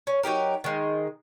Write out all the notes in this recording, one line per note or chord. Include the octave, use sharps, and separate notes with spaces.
C#4
F#3 D#4 G4 A#4
D#3 G#3